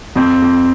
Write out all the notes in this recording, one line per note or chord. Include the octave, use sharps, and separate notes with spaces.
F2 C4
F2